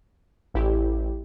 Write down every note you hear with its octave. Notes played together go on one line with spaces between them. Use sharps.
A1 E4 G4